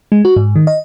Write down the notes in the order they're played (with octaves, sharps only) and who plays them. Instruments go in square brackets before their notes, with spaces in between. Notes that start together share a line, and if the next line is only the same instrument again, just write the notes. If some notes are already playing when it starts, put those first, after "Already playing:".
[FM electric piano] G#3
F#4
G#2
D#3
D#5